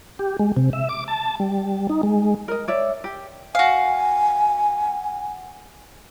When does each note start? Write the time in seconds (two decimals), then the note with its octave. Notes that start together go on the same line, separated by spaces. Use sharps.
0.19 G4
0.39 G#3
0.57 C3
0.73 E5
0.89 D6
1.08 A5
1.40 G3
1.89 D#4
2.03 G#3
2.48 A#4 D#5
2.68 C#5 D5 E5
3.04 G4
3.55 F#4 F5 G#5